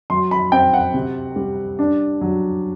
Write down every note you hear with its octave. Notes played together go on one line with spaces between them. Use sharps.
F#3 C6
B5
C4 G5
F#5
C3
G3
D4
F#3